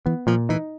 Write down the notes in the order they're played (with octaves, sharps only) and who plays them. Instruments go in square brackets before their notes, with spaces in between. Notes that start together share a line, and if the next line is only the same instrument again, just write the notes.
[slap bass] E3 [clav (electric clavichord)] B3
[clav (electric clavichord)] A#2 [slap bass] F3
[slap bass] E3 [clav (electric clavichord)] D#4